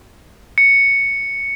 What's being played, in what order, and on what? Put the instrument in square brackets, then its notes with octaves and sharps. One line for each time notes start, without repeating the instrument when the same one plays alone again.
[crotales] C#7